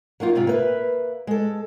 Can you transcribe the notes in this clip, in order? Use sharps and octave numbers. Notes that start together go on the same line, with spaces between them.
F#3 A#3 D#4 F4
G#2 C3 F4
A#3 B4 E5
G#3 A4